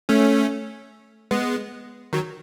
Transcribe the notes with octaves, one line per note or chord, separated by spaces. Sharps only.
A3 C#4
G#3 B3
D#3 F#3